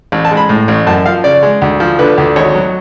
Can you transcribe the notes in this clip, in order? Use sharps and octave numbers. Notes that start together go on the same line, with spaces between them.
A1
A5
G#3
B5
A2
A1
F#2 A5
F3 F5
C#3 D5
G#3
D2
F3
D3 B4
D2
G#1 C#5
F#3